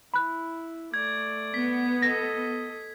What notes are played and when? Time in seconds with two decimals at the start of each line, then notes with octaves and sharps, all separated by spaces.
0.14 E4 B5 F#6
0.94 A3 D5 G#6
1.54 B3 B6
2.02 A4 D#5 A#6